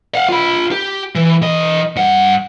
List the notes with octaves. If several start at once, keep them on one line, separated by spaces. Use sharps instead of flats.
F5 F#5
F4 B5
G4
E3
E3 D#5
G2 F#5